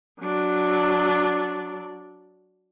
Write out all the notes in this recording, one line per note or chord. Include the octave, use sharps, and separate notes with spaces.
F#3 D4